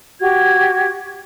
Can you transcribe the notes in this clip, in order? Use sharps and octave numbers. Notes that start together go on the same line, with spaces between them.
F#4 G4 G#6